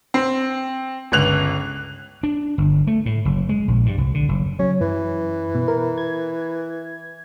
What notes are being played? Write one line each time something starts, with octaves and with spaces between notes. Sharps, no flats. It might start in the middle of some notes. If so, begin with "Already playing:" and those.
C4
G1 C#2 F#6 F7
D4
G1
A3
A2
F#1
G#3
A#1
G2
C2
D3
F#1
F#3 C#4
F#2 E3
B2
A#4
G#6